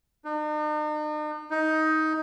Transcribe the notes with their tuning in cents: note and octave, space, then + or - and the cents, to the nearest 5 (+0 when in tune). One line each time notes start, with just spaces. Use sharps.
D#4 -45
D#4 +15